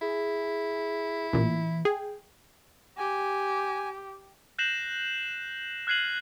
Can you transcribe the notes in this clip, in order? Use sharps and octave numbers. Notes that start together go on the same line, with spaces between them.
E4 G#4
A1 A#2 E3
G#4 G5
G4 G#5
F#6 G6 A#6 C7 E7 F#7
F6 F#6 G#6 C7 D#7 F#7